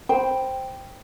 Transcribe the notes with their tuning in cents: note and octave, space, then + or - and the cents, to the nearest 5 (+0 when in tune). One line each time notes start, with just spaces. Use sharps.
C5 +0 G5 +0 B5 +0